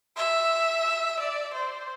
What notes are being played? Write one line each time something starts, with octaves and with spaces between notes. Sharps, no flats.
E5
D5
C5